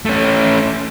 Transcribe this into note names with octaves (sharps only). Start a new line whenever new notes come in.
A3 C#4